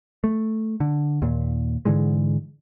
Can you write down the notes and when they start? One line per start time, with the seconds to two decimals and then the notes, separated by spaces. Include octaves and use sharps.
0.24 A3
0.80 D3
1.22 D#2 A#2
1.85 G#2 D3 E3 G#3